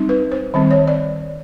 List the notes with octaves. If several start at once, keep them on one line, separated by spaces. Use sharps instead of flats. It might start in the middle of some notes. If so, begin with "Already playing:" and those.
Already playing: G3 C4 D#4
B4
C5
D#3 G3 C4
C#5
D5